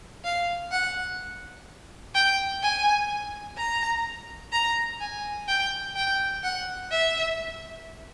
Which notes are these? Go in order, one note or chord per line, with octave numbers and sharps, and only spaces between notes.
F5
F#5
G5
G#5
A#5
A#5
G#5
G5
G5
F#5
E5